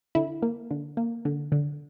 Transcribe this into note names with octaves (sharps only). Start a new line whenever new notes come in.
D3 E4
A#3
D3
A#3
D3
D3